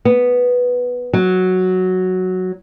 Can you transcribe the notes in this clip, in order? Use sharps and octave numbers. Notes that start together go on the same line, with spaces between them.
B3
F#3